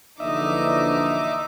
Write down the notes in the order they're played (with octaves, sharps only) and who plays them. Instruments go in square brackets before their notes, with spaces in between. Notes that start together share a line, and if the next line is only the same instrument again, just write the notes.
[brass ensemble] A#1 D3 E3 [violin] D#4 D6 [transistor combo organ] D#5 E5